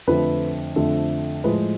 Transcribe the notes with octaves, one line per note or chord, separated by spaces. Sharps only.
F2 D3 F3 A3 B4
F2 D3 F3 A3
A2 F3 G#3 B4